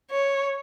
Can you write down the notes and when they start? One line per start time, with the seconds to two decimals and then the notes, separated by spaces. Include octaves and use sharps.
0.11 C#5